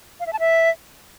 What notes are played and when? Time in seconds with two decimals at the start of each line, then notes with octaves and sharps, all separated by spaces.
0.20 F5
0.26 E5
0.33 A5
0.39 E5